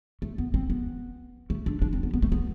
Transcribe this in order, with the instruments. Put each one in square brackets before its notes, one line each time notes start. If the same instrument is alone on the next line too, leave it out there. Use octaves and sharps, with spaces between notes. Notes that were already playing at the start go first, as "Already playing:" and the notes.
[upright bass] A3
B3
C4
B3
A3
D4
D4
C4
B3
B3
A3
B3